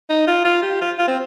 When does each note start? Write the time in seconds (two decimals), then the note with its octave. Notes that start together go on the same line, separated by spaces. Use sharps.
0.10 D#4
0.27 F4
0.45 F4
0.62 G4
0.81 F4
0.99 F4
1.08 C4